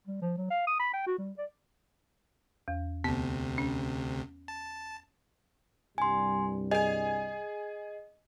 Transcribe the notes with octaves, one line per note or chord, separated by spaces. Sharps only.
G3
F3
F#3
F5
D#6
B5
G5
F#4
G3
D5
E2
D2 C3 B3
C#4
A5
C2 G2 G3 G#5 C6
G#4 D#5 G#5